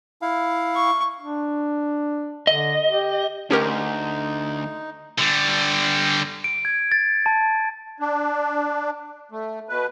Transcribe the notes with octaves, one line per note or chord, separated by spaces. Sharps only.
E4 F5
C#6
D4
D3 D#5
G4
D2 C#4 D#4 G4 A#4
D3 G3
D7
G#6
A6
A5
D4
A3
B2 B4